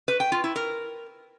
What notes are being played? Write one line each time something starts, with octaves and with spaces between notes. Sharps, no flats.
B4
G5
F4
E4
A#4